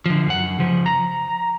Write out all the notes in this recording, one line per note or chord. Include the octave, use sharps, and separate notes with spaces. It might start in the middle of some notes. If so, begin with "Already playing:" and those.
D3 F3
F#2 F#5
C#3 F3
A#5